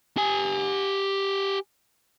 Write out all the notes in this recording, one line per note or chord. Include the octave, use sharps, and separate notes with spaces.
G4 G#5